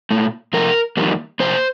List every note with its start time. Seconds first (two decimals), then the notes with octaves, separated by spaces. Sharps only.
0.11 A#2 A3
0.53 C3 F3 A3 A#4
0.97 F2 D#3 G3 A#3
1.40 C3 F3 A#3 C5